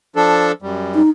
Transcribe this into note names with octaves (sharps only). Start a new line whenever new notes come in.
F3 D4 A4
F#2 G3
D#4